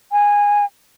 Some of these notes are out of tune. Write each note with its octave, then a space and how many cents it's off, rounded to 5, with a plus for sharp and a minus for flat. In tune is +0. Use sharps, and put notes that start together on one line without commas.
G#5 -15